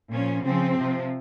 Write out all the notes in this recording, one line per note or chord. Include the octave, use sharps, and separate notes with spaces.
A#2 F3 C#4
C#3 F3 C4
C3 F3